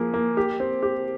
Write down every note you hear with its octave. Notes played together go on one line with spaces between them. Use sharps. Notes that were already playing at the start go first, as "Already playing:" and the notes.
Already playing: F3 A#3 G#4
A#3
G4
C4
G4